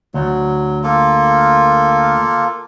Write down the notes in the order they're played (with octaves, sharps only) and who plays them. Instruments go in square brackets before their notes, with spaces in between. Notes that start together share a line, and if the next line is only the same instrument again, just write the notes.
[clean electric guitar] D2 [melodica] F#3
[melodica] A#3 F4 A4